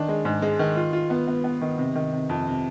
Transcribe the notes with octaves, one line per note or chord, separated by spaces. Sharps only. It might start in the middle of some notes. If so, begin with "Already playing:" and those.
Already playing: D#3 D4
G#3
G#2
G#3
D#3
F4
F4
B3
B3
B3
D#3
C3
D#3
C3
F2
C3